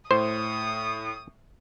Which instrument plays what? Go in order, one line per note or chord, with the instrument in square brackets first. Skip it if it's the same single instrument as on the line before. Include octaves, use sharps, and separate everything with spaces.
[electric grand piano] A2 [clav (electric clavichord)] C5 [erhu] D#6